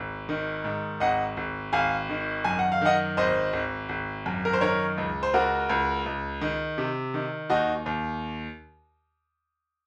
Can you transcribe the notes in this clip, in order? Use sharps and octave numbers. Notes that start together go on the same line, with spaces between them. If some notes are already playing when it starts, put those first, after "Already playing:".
Already playing: G#1
D#3
G#2
G#1 D#5 F#5
G#1
G#1 F5 G#5
D#3
F#2 G#5
F#5
F5
D#3 D#5 F#5
G#1 C5 D#5
G#1
G#1
F#2
A#4
C5
D#3 A#4 C#5
C#2
C5
C#2 F#4 A#4
C#2
C#2
D#3
C3
D#3
D#2 D#4 F#4
D#2